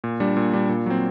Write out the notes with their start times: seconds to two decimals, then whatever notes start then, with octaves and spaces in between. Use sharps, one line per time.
0.04 A#2
0.20 G3 D4
0.37 A#2
0.53 G3 D4
0.69 A#2
0.86 F#3 C4